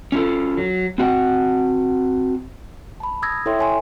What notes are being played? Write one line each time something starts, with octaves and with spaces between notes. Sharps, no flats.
C#4 F4 A4
F#3
C4 F#4 F#5
A5 B5
D#6 E6 G#6 A#6
E4 A4 C#5 E5 G5 C6
C#5 G#5 C6